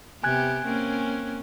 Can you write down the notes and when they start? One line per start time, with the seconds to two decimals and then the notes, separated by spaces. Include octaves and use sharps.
0.24 C3 B3 G4 G#5 F#6 G#6
0.65 A#3 C4 C#4